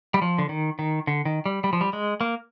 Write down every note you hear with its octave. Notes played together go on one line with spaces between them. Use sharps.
G3
F3
D3
D#3
D#3
D3
D#3
G3
G3
F3
G3
G#3
A#3